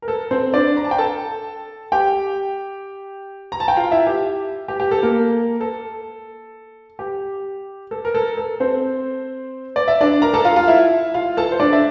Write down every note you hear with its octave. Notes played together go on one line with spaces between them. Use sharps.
A#4
A4
C4 C5
D4 D5
A#5
A5
G5
A4 A5
G4 G5
A#5
A5
G5
F4 F5
E4 E5
G4
G4
G4
A4
A#3 A#4
A4
G4
A4
A#4
A4
A4
C4 C5
D5
E5
D4 D5
A#4 A#5
A4 A5
F4 F5
F4 F5
E4 E5
F4 F5
A4 A5
C5
D4 D5
E5